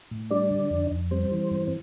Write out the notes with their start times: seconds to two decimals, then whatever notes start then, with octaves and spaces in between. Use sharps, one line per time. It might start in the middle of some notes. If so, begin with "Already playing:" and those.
0.11 A2
0.31 G3 D4 D5
0.51 D3
0.70 F2
0.91 F2
1.11 G3 C4 C5
1.31 E3
1.51 G2